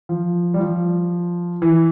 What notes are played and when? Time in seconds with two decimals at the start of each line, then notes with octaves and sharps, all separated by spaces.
0.09 F3
0.54 G3
0.60 F3
1.62 E3